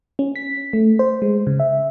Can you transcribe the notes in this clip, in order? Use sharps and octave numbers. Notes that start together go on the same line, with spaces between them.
C#4
B6
A3
C5
G#3
C#3
E5